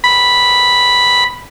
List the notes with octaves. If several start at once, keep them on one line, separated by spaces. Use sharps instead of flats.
B5